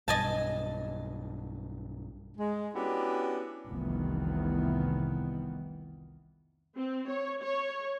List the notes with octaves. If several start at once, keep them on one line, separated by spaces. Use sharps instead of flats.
B1 G2 D#5 G#5 A5
G#3
B3 C#4 D4 E4 F#4 G4
F1 C2 D#3 E3 B3
C4
C#5
C#5